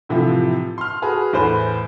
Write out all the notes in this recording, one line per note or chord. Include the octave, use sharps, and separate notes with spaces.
A2 C3 E3 F3
C6 F6
F#4 G#4 B4
E2 A2 B4 C5